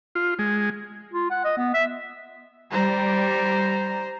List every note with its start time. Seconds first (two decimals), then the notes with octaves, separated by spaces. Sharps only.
0.15 F4
0.39 G#3
1.13 F4
1.31 F#5
1.44 D#5
1.57 B3
1.74 E5
2.71 G3 C5 A#5